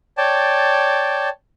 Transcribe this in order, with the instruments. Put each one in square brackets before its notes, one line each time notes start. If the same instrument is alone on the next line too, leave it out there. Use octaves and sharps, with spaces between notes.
[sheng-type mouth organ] C#5 D5 G5 A5